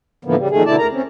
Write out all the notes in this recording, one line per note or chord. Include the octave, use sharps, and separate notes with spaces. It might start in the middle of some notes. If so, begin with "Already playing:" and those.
A2 D3 E3 F3 A#3 B3
C#3 G3
F2 A#2 D#3 A3 G#4
B2 D3 A3 E4 D5 A5
D2 A#4 A#5
C4 C#4